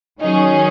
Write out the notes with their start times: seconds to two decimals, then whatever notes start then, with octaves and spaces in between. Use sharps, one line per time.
0.21 D#3 F#3 C#4 D#4 G#4